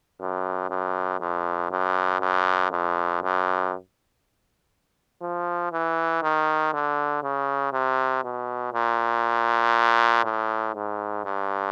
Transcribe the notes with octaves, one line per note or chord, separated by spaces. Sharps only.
F#2
F#2
F2
F#2
F#2
F2
F#2
F3
E3
D#3
D3
C#3
C3
B2
A#2
A2
G#2
G2